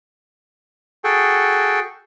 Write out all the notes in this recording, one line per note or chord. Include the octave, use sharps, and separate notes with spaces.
F#4 G#4 A4 G5